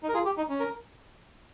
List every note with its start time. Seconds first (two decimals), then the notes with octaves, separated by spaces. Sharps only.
0.03 D#4
0.08 A#4
0.14 F4 G#4
0.25 G4
0.37 D#4
0.49 C#4
0.60 A#4